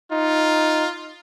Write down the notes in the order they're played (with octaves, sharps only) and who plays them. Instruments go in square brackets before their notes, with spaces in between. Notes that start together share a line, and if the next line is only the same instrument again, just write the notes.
[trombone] D#4 [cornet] F4